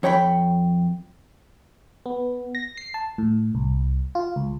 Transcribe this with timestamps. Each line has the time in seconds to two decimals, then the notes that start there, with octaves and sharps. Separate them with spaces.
0.03 F2 C#5 G5 A#5 B5
2.06 B3
2.55 A#6
2.77 C7
2.94 A5
3.18 A2
3.55 C2
4.15 F4
4.36 C#2